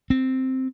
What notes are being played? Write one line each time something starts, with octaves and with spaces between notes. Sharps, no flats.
C4